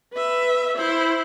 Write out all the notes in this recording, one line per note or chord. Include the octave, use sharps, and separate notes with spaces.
B4 E5
E4 C5